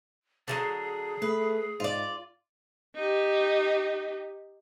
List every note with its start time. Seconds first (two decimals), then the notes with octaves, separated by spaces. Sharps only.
0.48 D3 E3 F#3 G#4
1.22 A3 B4
1.80 G#2 F4 D5
2.96 D#4 G4